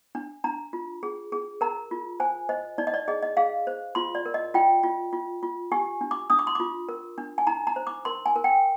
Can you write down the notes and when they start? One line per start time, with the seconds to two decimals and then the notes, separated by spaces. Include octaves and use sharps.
0.15 D4
0.44 D4 A#5
0.73 F4
1.03 G#4
1.32 G#4
1.61 A#4 A#5
1.91 F4
2.20 C5 G#5
2.49 C5 D#5
2.78 D#4 D5
2.87 D#5
2.94 D5
3.08 G#4 D#5
3.22 D#5
3.37 G#4 F5
3.67 C5
3.95 F4 C6
4.15 D5
4.26 A#4
4.34 D#5
4.54 F4 G5
4.83 F4
5.13 F4
5.43 F4
5.72 G4 G#5
6.01 D4
6.11 D6
6.30 D4 D#6
6.39 D6
6.47 C6
6.55 F4 D6
6.89 A#4
7.18 D4
7.38 G#5
7.47 D#4 A#5
7.67 A#5
7.76 C5
7.87 D6
8.05 A#4 C6
8.26 G#5
8.36 A#4
8.44 G5